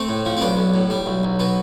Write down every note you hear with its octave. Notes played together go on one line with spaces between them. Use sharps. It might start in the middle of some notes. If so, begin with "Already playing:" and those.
Already playing: A3 C4
A2
F3
C4
B1 B3 D4
B1
A2
G3
B1
B1
B2 B3